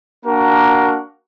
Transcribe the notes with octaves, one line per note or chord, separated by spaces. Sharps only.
A#3 D4 F#4 A#4